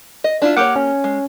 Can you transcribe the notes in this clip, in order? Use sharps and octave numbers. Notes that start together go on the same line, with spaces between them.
D#5
D4 E4 F4
A#3 G4 C#5 F#5 D6
C#4
G#3